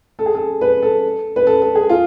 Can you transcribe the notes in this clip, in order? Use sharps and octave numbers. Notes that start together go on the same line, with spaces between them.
A4
G#4
A4
B4
A4
B4
A4
A4
G#4
F4